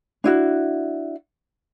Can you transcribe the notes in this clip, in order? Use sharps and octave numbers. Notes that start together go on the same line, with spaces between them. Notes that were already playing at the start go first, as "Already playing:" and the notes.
D4 E4 F#4